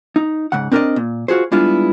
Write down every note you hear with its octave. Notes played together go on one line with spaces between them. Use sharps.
D#4
G#2 C#3 F#5
C4 D4 A#4 C5 D5 D#5
A#2
F4 F#4 G#4 C5
G3 G#3 B3 D4 E4 F4